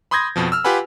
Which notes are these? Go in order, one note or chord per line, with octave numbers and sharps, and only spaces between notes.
B5 C6 D#6 G6 G#6 A#6
F2 B2 F3
E6 F6
F4 G4 B4 F#5 G#5 B5